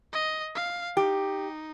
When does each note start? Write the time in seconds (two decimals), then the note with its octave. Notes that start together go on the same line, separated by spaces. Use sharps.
0.13 D#5
0.55 F5
0.97 D#4 G4